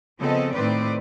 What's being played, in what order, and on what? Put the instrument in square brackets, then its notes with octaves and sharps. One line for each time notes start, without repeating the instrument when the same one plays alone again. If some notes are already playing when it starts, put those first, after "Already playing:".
[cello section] C#3 F3 B3 C4 A4 D#5
A2 D#3 C4 B4 C5 D5